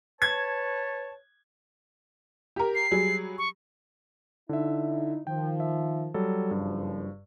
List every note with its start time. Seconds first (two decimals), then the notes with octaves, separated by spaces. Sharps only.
0.22 B4 C#5 A5 G#6
2.56 G4 A#4
2.75 C7
2.91 F#3 G3 G#4
3.38 C#6
4.49 D3 D#4 E4 E5
5.27 D#3 F3 G5
5.60 E5
6.14 F#3 G3 A4
6.51 F#1 G2 F3